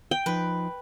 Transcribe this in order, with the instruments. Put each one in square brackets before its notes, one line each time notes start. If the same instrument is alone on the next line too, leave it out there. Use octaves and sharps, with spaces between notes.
[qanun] G5
[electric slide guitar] F3 D#4 [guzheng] B4